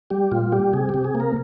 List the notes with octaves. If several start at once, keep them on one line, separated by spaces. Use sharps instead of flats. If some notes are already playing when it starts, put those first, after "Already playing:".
G3 G4
A#2 F4
G3 G4
C3 G#4
C3 G4
G#4
A#3
A#4